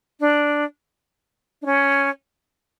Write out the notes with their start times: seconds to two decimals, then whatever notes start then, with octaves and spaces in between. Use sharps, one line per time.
0.20 D4
1.62 D4
1.65 C#4